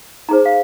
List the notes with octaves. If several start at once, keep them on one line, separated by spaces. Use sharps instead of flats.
D#4 G#4 C5 A#5
F5